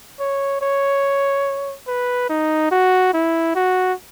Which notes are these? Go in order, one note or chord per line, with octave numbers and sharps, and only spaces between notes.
C#5
C#5
B4
D#4
F#4
E4
F#4